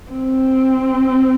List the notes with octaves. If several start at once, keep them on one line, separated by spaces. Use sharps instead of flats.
C4